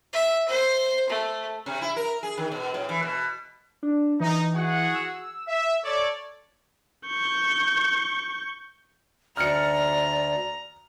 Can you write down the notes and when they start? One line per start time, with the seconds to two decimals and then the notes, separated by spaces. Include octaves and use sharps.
0.13 E5
0.48 C5
1.10 A3
1.66 C3
1.82 E4
1.96 A#4
2.23 G#4
2.37 D#3
2.52 B2
2.74 A2
2.89 E3
3.02 B2
3.83 D4
4.20 E3 D#4
4.55 F#4 G#4 F#5
4.95 E6
5.48 E5
5.84 A4 C#5 D5
7.07 C#6 G6
9.37 D2 D5 A#5 F6 C#7